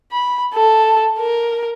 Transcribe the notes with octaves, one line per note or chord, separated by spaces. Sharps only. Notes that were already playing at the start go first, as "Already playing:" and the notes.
B5
A4
A#4